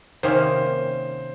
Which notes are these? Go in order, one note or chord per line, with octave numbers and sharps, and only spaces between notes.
C3 D#3 A#3 C#4 C5